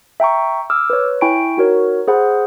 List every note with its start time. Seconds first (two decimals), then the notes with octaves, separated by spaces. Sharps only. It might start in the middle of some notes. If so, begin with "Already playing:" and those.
0.20 E5 G5 A#5 C#6
0.70 D6 E6 F6
0.90 B4 C#5
1.21 E4 G5 G#5 B5 C#6 D7
1.57 D#4 F#4 A#4 C#5
2.08 G#4 C5 F#5 B5